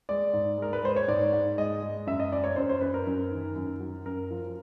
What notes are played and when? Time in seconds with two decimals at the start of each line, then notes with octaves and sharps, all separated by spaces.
0.09 G#3 D5
0.33 G#2
0.58 G#3 A#4
0.73 B4
0.83 G#3 C5
0.96 C#5
1.08 G#2 D5
1.33 G#2
1.58 G#3 D#5
1.83 G#3
2.07 F#2 E5
2.20 D#5
2.32 F#2 D5
2.44 C#5
2.56 F#2 C5
2.69 C5
2.81 F#2 B4
2.94 A#4
3.07 F#2
3.31 D#3
3.56 F#2
3.80 F#3
4.05 F#2 A#4
4.31 F3